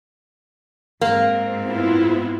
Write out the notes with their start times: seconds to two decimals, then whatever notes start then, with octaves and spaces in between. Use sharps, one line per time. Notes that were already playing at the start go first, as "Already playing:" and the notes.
1.01 G#2 A#3 C4
1.67 B3 E4 F4